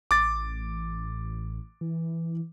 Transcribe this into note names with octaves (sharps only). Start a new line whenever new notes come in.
A1 D6 A6
E3